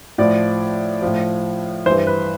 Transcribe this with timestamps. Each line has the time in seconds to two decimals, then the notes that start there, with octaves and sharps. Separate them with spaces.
0.18 A2 F3 D5
1.02 A2 F3
1.86 E3 C5
1.90 G2
2.07 B4